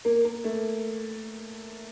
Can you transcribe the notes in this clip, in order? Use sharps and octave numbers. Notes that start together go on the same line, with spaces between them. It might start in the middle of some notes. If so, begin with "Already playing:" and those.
A#3
A#3
A3